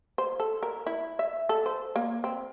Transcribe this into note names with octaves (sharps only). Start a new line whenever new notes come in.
C5
A4
A#4
E4
E5
A4
C5
A#3
C4